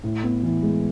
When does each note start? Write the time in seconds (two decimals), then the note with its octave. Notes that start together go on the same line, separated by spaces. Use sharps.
0.04 A2
0.23 B3
0.43 E3
0.63 G#3